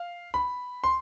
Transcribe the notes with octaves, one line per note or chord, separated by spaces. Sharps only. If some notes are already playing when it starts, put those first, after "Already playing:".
Already playing: F5
B5
C6